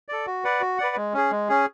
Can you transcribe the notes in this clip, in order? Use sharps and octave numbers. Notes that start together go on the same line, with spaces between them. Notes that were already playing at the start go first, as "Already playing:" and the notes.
A4 D5
F#4
B4 D5 F#5
F#4
B4 D5 F#5
G#3
C#4 G#4
G#3
C#4 G#4